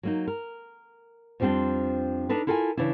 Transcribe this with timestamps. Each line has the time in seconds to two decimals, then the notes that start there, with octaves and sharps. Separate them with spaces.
0.03 F#3 A#3 D#4
0.27 A#4
1.40 F2 F3 G3 C4 D4 G5
2.29 D4 D#4 A4 B4
2.47 E4 F4 A4 A#4 G5 G#5
2.77 C#3 E3 D4 E4